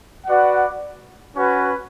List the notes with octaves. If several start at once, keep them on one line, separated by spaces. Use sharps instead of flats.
F#4 B4 D5 F#5
C#4 F#4 B4